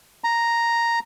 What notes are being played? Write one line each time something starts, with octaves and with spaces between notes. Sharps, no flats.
A#5